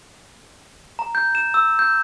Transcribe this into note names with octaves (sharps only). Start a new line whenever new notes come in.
A#5
G6
E7
E6
G6